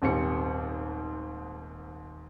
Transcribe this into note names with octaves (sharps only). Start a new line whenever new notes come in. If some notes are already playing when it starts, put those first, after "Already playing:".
D#1 D#2 G#2 C4 G4 C#7